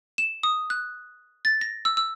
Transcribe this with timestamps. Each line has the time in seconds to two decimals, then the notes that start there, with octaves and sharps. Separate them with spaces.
0.18 E7
0.43 D#6
0.70 F#6
1.45 A6
1.61 A#6
1.85 E6
1.97 E6